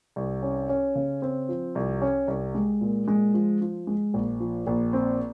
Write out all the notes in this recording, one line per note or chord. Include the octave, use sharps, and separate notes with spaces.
C2
C#4
C#4
C#3
C4
F3
C2
C#4
C2
G#3
A#2
G#3
F3
F3
G#3
A#1
F3
A#1
C4